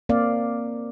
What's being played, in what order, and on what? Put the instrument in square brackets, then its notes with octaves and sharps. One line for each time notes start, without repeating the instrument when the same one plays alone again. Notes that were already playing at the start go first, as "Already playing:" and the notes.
[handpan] A#3 C4 D5 F5